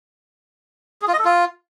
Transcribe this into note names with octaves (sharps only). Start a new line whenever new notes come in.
G#4
F4
D#5
A4
F4